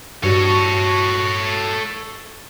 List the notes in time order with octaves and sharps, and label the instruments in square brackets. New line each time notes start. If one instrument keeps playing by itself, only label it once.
[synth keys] G2 [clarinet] F#4 [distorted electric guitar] A4 C#5